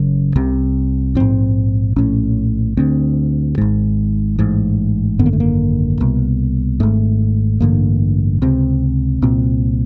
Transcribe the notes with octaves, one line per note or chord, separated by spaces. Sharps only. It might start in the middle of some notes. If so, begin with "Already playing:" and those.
Already playing: F#1 F#2 C#3 C#4
C2 C3
A#1 G#2 C4
A#1 A2 C#4
D2 D3 C4
G#1 G#2
A1 G#2
G#1 F#2 D3 B3
A#3
A3
A#3
C2 B2
G#1 G#2 A3
A1 G2 D3 A#3
C#2 C3 C4
C2 A#2 C4